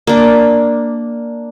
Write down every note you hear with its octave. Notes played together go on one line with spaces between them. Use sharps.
A#3 D4